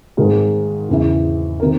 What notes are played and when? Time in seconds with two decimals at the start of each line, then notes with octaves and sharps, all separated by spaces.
0.17 G#1 G#2 D#3 G#3 A#4
0.89 E2 C#3 E3
1.60 C3 D#3 A#4